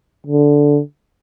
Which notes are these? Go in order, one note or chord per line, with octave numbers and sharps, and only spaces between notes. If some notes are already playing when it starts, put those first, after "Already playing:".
D3